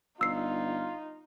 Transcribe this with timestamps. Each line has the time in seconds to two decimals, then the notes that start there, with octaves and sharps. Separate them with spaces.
0.21 G1 D#4 F4 E6 C7